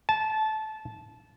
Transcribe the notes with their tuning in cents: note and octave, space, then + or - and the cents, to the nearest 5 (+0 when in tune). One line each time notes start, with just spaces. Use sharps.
A5 -20